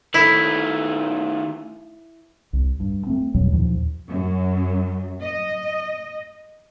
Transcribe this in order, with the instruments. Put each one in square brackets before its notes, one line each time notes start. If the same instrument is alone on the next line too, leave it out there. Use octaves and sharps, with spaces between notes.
[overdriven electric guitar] D#3 A3 [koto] E4
[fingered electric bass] C2
G2
A3 C4
E2 G2 B2 F#3
D#2 A#2 F3
[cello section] F#2
D#5